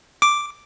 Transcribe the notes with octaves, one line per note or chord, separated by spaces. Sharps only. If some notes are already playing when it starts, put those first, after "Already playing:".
D6